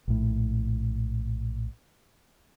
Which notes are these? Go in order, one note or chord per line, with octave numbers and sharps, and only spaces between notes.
A#1 A2